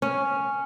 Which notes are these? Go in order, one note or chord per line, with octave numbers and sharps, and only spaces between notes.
C#4